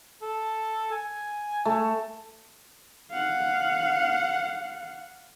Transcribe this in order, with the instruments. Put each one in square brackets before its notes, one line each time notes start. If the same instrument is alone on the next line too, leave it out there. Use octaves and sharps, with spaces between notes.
[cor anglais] A4
G#5
[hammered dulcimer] A3
[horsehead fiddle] F5 F#5